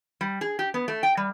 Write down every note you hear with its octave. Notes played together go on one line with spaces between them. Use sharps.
G3
G#4
G4
B3
A3
G5
G3